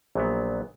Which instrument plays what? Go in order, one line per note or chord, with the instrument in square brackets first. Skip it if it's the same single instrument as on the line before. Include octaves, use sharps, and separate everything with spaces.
[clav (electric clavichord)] A#1 A#2 F#3 B3